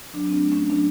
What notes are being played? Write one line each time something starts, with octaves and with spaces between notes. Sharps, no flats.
F#3 D4
C4
D4
A3
C#4
A2
F#3 D4